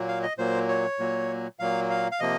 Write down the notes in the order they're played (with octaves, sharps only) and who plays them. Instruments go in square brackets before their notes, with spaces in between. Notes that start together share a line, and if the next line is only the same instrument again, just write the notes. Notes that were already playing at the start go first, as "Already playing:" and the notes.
Already playing: [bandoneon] A#2 F#3 A#3
F5
D#5
A#2 F#3 A#3 C5
C#5
A#2 F#3 A#3
A#2 F#3 A#3 F5
F5
F5
C3 F3 A#3 D#5